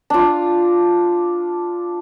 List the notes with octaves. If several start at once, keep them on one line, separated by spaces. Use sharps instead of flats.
D4 F4